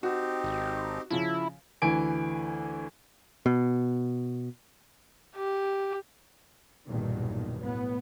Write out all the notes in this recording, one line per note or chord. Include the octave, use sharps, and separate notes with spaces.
C4 D#4 F#4 G4
G#1
C#3 F3 E4
D2 E3 G#5 D7
B2
G4
B1 E2 G2 A#2 D#3
A2 B3